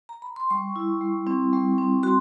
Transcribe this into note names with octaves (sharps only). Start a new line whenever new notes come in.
A#5
B5
C6
G3 C#6
E4
G3
C4
G3
C4
F#4 C6